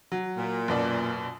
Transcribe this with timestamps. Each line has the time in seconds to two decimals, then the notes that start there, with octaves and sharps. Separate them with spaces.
0.12 F#3
0.37 A#2
0.68 F#2 B2 D5